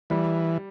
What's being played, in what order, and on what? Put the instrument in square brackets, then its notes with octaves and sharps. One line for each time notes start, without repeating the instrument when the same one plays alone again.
[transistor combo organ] E3 [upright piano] G3